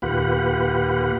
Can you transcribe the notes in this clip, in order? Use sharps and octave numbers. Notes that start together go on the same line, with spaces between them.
D#2 A#2 F4 G4 B4 F#5